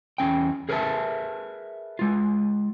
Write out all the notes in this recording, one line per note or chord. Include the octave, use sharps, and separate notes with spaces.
E2 C#4 G5
G#4 A#4 B4 E5 G#5 A5
G#3 F4